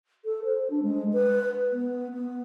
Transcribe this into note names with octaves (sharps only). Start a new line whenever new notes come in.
A4
C5
D4
G#3
B4
B3
B3